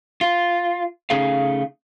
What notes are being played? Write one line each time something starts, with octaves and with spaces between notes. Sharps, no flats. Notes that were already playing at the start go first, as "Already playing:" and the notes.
F4
C#3 A3 C#4 D#4 G#4 F5